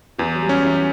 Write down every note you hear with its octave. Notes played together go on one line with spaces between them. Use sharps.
E2 E3
F#3
G3
F#3 C#4
E3